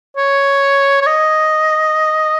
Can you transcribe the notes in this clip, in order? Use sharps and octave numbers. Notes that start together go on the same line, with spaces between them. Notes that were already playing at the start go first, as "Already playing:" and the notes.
C#5
C#5
D#5